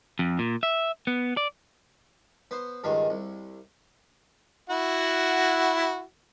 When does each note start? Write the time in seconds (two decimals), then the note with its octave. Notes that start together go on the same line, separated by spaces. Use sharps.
0.19 F2
0.39 A#2
0.63 E5
1.07 B3
1.37 D5
2.51 B3 C5
2.84 C#2 G2 D#3 G#3
3.10 C2
4.70 E4 F#4 F#5